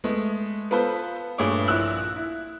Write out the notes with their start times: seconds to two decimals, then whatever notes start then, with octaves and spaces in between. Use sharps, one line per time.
0.04 G#3 A3 B3
0.71 B3 F4 A4 B4 C5
1.38 G2 A#2 A3 G#4 C#5 D6
1.68 A#1 A#2 E4 E6 F#6
2.16 E4